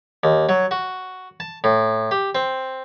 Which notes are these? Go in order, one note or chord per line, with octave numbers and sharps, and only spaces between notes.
D#2
F#3
F#4
A5
A2
G4
C4